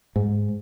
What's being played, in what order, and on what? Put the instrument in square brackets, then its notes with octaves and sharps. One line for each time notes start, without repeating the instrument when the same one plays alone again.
[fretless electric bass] G#2